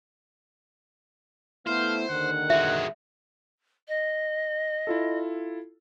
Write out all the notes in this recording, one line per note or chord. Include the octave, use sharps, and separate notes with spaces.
A3 B3 E4 C5 F5
D#2 D3 D#3 F#5
G#3 F#4 E5
D#5
E4 F4 A4